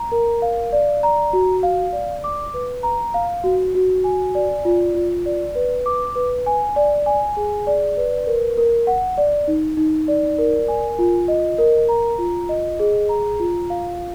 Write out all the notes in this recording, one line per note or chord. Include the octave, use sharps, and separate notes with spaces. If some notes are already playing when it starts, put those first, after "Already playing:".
Already playing: A#5
A#4
F5
D5
A#5
F#4
F5
D5
D6
B4
A#5
F5
F#4
F#4
G#5
D5
F4
F4
D5
B4
D6
B4
G#5
D5
G#5
G#4
D5
B4
A#4
A#4
F#5
D5
D#4
D#4
D5
A#4
G#5
F4
D#5
A#4
A#5
F4
D#5
G#4
A#5
F4
F5